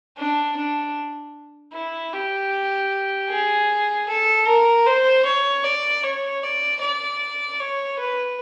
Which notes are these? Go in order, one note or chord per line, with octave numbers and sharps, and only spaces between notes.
D4
D4
E4
G4
G#4
A4
A#4
C5
C#5
D5
C#5
D5
D5
C#5
B4